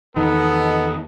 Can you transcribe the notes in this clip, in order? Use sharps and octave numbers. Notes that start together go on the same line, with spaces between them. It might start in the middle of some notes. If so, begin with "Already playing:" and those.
E2 D#3 B3 D#4 A4